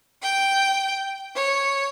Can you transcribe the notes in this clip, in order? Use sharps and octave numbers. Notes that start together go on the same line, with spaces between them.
G5
C#5